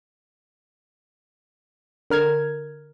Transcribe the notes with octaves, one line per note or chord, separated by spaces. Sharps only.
D3 A#4 F6 G#6